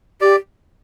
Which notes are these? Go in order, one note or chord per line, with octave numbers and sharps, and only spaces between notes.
G4 D5